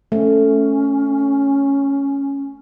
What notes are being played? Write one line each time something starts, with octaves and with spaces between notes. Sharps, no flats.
A3 C#4